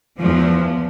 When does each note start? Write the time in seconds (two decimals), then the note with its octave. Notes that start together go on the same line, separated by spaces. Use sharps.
0.17 E2 F3